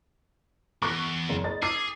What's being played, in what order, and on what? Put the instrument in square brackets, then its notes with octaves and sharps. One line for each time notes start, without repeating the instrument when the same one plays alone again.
[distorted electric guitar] E2 [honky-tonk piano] C#6 F#6
[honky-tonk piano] F#1
D#5 A6
[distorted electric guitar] G#4 [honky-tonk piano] D6 E6 C7